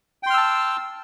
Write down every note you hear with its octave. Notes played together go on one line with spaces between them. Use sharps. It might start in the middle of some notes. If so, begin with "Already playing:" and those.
G5 A5 C6 E6 F6